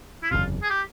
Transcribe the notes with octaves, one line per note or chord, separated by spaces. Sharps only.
E4
F#1 E2 C3 F4
G#4
G4